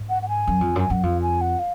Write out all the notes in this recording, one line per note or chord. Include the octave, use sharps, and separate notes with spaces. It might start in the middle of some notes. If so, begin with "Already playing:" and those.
Already playing: G#2
F#5
F#5
G#5
F#2
F2
F#2 G#5
F#2 F#5
F2 F5
G#5
F#5
F5